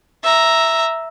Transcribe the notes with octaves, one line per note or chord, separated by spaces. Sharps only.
E5 A#5